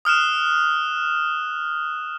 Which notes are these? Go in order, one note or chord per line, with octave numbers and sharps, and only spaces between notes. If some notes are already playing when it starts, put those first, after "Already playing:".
D#6 F6 F#6 E7